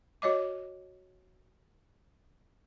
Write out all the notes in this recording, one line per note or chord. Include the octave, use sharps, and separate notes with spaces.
F#4 C#5 D#5 D6